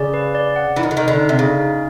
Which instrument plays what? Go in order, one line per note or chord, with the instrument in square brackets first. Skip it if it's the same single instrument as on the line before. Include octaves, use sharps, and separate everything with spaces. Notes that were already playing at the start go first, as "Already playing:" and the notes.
Already playing: [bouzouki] C#3 [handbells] D5
[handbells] B4
D5
F#5
[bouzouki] E3 [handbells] D#4
[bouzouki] D#3
D3
[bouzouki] D#3 [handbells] D#4
[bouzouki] D3
[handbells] D#4
[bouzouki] C3
[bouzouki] C#3 [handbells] D#4
[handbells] D#4